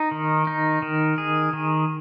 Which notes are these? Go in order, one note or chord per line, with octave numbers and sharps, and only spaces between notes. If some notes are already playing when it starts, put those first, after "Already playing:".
Already playing: D#4
D#3
D#4
D#3
G#4
D#3